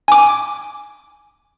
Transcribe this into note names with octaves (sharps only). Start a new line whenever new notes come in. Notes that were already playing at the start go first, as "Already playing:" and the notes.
G#5 D6